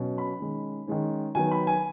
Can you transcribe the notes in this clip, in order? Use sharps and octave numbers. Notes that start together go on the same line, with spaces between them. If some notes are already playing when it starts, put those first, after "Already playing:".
Already playing: B2 F#3 C#4
B5
D#3 G#3 C#4
D#3 G#3 C#4
D#3 F#3 B3 G#5
B5
G#5